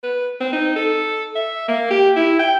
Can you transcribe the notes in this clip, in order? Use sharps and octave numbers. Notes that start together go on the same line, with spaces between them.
B4
C4
D#4
A4
E5
A#3
G4
E4
G5